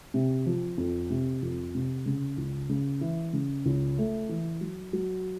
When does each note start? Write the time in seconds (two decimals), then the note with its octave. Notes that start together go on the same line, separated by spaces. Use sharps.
0.14 C3
0.46 F3
0.78 F2
1.10 C3
1.42 F2
1.75 C3
2.06 C#3
2.38 C#2
2.69 C#3
3.01 E3
3.33 C#3
3.66 C#2
3.98 A3
4.29 E3
4.61 F#3
4.93 F#3